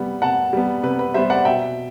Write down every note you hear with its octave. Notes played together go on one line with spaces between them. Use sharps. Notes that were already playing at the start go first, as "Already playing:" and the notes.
Already playing: C3 G3 B3 F#5
C3 F#5 A5
G3 B3
C3 B4
B4
G3 B3 C5 E5
D5 F#5
B2 E5 G5